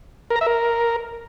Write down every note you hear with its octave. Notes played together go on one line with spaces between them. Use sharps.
A#4
A#5
E5
A#4